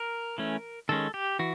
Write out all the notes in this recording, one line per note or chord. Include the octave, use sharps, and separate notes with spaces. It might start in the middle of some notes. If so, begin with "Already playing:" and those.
Already playing: A#4
E3 A3 C#4
D#3 G#3 C#4 A4
G4
E3 F#4